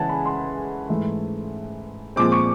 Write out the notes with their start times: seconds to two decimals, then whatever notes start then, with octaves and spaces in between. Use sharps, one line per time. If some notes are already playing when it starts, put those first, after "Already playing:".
Already playing: C#3 E3 G#3 C#4 F#5 G#5 A5
0.09 B5
0.26 C6
0.89 G#2 E3 A3
2.16 A#2 F3 G#3 C4 D6
2.32 C#6